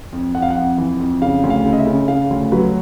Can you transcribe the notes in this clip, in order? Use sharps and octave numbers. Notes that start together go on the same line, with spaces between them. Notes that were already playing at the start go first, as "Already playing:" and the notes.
F2
F2 F#5
F5
F#5
F2
E3
F2
C#3 F5
D2
F5
C#3
D#5
E5
C#3
C#3 F5
D2
F#3 B4